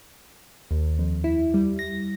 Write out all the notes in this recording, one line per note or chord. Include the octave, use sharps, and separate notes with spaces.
D#2
F2
E4
G3
A#6